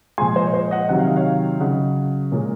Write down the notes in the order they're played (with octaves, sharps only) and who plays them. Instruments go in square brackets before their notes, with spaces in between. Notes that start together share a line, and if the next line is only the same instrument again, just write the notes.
[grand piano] A#2 F3 G#3 G#5 C6
C5 D#5
C#5
C5 D#5
D#5 F#5
C3 D#3 F#3 F#5
F5
D#5
C#5 F5
C#3 F#3 D#5 F#5
A#2 G#3 A#4 C#5